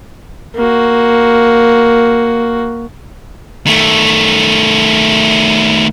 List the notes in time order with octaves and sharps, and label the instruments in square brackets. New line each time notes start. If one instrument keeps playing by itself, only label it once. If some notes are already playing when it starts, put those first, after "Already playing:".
[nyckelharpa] A#3 F#4
[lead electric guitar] D#3 A3